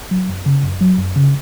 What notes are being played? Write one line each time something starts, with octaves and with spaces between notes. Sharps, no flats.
F#3
F#2
C#3
F#2
F#3
F#2
C#3